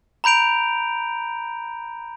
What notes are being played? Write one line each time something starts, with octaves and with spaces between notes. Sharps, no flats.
A#5 B5 G6 D7 F7